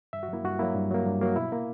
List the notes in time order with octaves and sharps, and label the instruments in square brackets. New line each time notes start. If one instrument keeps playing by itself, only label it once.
[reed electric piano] G2 E5
F#4
F#3 A#3 E4
G2 F#4
F#3 A#3 E4
G2
F#3 A#3
G2
F#3 A#3
B2 E4
A#3